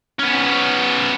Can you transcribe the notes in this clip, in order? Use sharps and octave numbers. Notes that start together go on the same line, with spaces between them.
B3 C#4